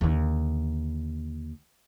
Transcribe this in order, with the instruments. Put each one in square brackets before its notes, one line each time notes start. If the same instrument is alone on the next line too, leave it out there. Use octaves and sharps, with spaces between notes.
[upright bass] D#2 D3